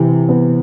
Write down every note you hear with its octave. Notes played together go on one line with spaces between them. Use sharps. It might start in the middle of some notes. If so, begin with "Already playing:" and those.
Already playing: C3 E3
B3